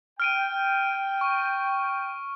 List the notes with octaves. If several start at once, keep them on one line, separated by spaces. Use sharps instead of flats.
G5 F6 D7 D#7
C#6